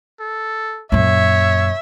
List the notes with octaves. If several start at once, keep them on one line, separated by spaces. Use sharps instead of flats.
A4
F#2 A#2 C#5 E5